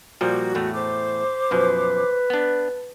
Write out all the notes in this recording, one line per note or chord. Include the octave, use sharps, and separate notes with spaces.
A#2 F3 G3 F#4
E2 A2 A3
C5 D6
F#2 B2 F3 B4
B3 D4